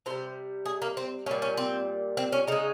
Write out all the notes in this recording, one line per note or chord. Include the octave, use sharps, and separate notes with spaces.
C3 G3 C5
G#4
A#3
C4
A#2 G3 C#4
C#4
C4
C4
C#4
C#3 G#3 D#4